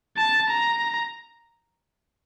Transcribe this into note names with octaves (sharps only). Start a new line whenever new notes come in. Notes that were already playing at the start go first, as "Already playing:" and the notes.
A5
A#5